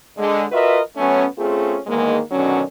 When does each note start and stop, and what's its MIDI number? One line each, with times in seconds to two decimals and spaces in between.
0.18 0.44 50
0.18 0.44 56
0.51 0.79 65
0.51 0.79 66
0.51 0.79 70
0.51 0.79 71
0.51 0.79 75
0.51 0.79 76
0.97 1.25 54
0.97 1.25 57
0.97 1.25 59
0.97 1.25 61
1.38 1.78 57
1.38 1.78 60
1.38 1.78 61
1.38 1.78 65
1.38 1.78 68
1.87 2.20 40
1.87 2.20 44
1.87 2.20 51
1.87 2.20 56
1.87 2.20 58
2.31 2.62 47
2.31 2.62 50
2.31 2.62 51
2.31 2.62 54
2.31 2.62 61